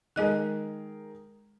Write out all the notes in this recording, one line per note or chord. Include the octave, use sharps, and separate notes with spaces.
D#3 G#3 G#4 A#4 D#5 F#6